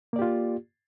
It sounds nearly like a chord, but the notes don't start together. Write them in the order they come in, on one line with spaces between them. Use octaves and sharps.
A#3 D5 G4 F4